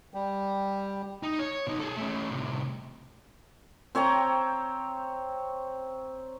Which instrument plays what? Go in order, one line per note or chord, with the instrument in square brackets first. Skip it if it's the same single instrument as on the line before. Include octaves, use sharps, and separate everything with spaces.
[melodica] G3
[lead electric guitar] D#4
C#5
B2 D#4
G#4 A4
A3 C#4
A2 C3
[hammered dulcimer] C4 C#5 G5 A#5